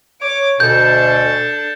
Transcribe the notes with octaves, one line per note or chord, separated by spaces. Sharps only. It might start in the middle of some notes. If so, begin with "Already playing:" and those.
C#5 D6
D2 B2 D4 A4 G6